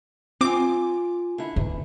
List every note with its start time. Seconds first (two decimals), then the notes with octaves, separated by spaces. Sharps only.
0.41 C4 F4 G#5 D6
1.38 D3 E4
1.56 E2 D3